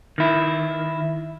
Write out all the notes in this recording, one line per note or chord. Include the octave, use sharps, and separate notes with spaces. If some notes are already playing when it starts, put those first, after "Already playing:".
D#3 E4